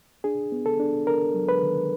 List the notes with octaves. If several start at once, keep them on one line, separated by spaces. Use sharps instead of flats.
D4 G#4
B3
A4
D4
D4 A#4
F#3
B4
D#3